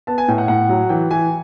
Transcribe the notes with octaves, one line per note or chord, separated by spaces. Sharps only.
B3 A5
G#5
A2 G5
F#5
A2 F#5
F#3
E3 G5
E3 G#5